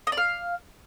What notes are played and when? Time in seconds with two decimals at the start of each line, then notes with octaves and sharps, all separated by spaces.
0.07 D#5
0.12 D5
0.17 F5